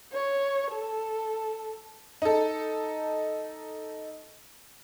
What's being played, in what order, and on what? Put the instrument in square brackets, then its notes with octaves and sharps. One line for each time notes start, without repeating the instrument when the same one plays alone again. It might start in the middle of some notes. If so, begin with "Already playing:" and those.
[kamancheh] C#5
A4
[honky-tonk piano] D#4 A4